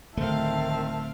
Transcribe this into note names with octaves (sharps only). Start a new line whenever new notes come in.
D1 D#3 A3 C4 E5 F5 A5